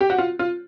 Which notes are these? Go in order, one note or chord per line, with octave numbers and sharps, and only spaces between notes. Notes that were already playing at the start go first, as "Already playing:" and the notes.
G4
F#4
F4
F4